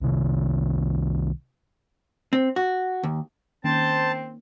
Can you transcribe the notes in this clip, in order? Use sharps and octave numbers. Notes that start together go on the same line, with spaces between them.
C2 C3 D#3
C4
F#4
D#2
D#3 A#3 C4 C#4 C5 A5